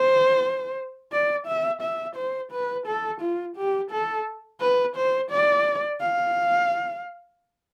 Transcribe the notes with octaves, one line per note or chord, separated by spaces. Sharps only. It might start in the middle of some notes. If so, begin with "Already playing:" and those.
Already playing: C5
D5
E5
E5
C5
B4
A4
F4
G4
A4
B4
C5
D5
F5